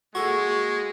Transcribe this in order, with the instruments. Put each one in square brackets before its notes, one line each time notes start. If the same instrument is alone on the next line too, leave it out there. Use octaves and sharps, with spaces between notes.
[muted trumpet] G#3 [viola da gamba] A#3 G#4 [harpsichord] F#4 A4 [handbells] C#6